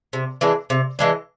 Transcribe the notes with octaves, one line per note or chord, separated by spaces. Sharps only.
C3
E3 G#3 D4
C3
E3 G#3 D4